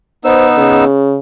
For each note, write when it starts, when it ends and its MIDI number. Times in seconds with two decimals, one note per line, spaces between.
0.25 0.84 59
0.25 0.84 63
0.25 0.47 72
0.25 0.84 88
0.57 1.19 49